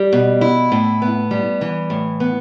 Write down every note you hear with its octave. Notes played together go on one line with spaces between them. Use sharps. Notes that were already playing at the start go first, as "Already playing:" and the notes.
Already playing: G3
B2
E4
A2
B3
G3
E3
A2
B3